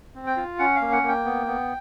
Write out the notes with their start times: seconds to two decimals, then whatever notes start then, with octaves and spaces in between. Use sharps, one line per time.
0.15 C4
0.27 G5
0.37 F4
0.59 C#4 F#5
0.76 F5
0.81 A#3
0.92 F#5
1.03 A#3
1.08 G5
1.25 B3
1.47 B3